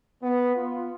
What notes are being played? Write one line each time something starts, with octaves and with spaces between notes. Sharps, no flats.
B3
F4